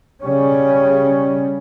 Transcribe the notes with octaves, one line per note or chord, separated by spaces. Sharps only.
C#3 G3 C#4